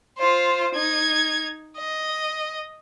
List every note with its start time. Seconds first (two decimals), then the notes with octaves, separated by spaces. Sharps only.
0.18 F4 C5
0.75 D#4 G#6
1.78 D#5